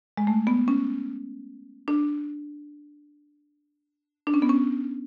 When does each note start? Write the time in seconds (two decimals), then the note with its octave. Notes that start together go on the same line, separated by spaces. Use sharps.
0.17 G#3
0.27 A3
0.47 B3
0.68 C#4
1.88 D4
4.27 D4
4.34 C#4
4.42 B3
4.49 C#4